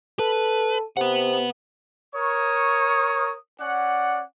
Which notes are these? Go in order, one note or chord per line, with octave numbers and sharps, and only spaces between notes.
A4 B4
C3 B4 F#5
A#4 C#5 C#6 D#6
C#4 D5 F#5